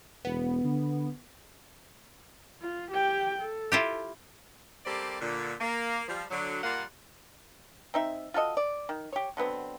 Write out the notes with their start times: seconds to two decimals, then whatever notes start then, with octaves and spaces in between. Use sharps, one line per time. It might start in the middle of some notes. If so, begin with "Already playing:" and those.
0.25 E1 B3
0.64 D3
2.62 F4
2.91 G4 G5
3.41 A4
3.72 E4 F4 G4
4.86 G3 A#3 C4 G4 A4 D5
5.20 A#2 D3
5.60 A#3
6.08 F3 G3
6.30 D3 F#3
6.63 A#2 G3 A#3 F4 F5 F#5
7.94 C4 D#4 E5
8.34 F4 F#4 A4 D#5
8.57 D5
8.89 D#3
9.13 G4 C#5
9.37 D3 F#3 B3 C4